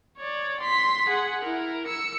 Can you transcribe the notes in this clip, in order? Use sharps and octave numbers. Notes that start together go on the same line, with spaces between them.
C#5 D5
C6 B6
G#4 F#5
E4 A#4
E6 C#7